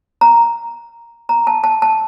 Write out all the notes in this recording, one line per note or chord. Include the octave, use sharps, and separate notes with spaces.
A#5
A#5
A5
A5
A5